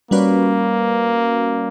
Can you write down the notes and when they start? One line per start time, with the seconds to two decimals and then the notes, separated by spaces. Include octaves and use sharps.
0.11 G3 A#3 C#4 F#4 B4 D5